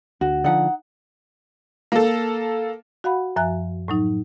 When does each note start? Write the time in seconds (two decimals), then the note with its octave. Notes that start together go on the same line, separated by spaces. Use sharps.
0.21 D2 F#4
0.44 D3 F3 D#4 F#5
1.92 A#3 A4
3.04 F#4 F5 F#5 B5
3.36 F#2 F3 E5 G#5 F#6
3.88 A2 F#3 D#4